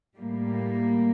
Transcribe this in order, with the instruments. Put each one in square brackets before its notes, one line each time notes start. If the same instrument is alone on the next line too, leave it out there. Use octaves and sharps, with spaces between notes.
[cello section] A2 G3 A#3